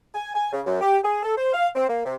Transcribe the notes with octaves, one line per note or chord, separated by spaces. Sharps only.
G#5
G#5
C#3
F#2
G4
G#4
A4
C5
F5
C4
A#3
C3